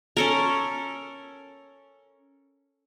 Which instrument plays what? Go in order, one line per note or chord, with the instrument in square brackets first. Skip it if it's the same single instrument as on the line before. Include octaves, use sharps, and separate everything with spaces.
[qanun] C#4 A4 A#4